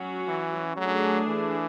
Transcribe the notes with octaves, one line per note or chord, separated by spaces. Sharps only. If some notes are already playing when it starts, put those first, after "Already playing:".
Already playing: F#3 C#4 F#4
E3
F#3 A3 D4 G#4
E3